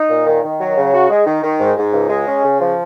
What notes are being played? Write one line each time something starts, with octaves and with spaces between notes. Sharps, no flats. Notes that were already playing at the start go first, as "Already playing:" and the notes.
Already playing: D#4
A#2
D#3
D#3
F#3
C#3
F#4
G#3
D#3
D#3
G#2
G#2
C#2
G#3
C#4
C#3
F3